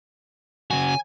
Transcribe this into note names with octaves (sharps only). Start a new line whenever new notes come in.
C#3 F#4 G#5